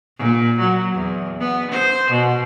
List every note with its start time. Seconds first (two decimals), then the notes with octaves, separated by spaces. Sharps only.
0.17 A#2
0.59 F#3
0.93 E2
1.40 B3
1.71 C5
2.11 B2